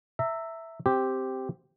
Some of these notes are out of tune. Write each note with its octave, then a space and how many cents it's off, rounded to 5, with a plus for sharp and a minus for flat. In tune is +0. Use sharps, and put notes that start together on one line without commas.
E5 +0 A#5 -30
C4 +0 G4 +0